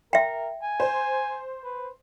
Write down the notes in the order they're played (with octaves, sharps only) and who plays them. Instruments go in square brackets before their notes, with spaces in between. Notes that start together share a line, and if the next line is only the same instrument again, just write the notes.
[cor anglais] A#4 [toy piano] E5 G5
[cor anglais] G#5
[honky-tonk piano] C5
[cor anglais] B4